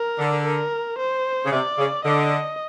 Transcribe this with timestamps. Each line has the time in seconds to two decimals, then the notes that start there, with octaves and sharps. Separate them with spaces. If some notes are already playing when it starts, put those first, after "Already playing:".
Already playing: A#4
0.18 D3
0.45 A#4
0.98 C5
1.45 C#3
1.51 C3 D5
1.78 C#3
2.04 D3 D#5